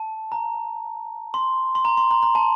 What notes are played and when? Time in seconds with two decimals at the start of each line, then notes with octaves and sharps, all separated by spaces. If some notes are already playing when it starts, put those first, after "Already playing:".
Already playing: A5
0.32 A#5
1.34 C6
1.75 C6
1.85 A#5
1.97 C6
2.11 A#5
2.23 A#5
2.35 A5